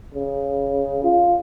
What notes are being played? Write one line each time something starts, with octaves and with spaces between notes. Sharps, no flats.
C#3
F4